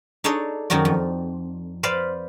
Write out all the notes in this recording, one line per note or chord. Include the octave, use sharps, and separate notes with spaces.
D4 D#4 G#4 A4 C#5 D5
F#2 D#3 D#4 F#4 D5
F2
B4 C5 D5 F5 B5